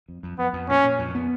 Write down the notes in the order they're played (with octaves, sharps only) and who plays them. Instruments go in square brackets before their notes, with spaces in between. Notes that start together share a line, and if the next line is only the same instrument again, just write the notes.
[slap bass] F2
F2
[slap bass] F2 [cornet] B3
[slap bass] F2
[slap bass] A#2 [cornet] C#4
[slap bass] A#2
F2
B3